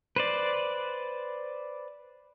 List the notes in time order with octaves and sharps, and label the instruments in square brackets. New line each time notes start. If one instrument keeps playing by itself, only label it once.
[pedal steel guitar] B4 C5 D5